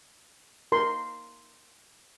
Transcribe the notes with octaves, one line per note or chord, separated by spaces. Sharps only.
A#4 C6